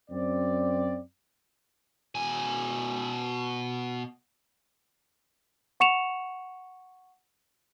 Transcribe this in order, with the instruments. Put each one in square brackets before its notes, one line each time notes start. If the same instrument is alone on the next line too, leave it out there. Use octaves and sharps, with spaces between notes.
[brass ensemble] F#2 C4 D5
[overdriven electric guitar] B2 G#5
[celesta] F#5 C#6 C#7 E7 F7